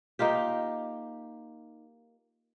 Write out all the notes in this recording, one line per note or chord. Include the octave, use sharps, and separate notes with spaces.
A#3 D#4 F4 G4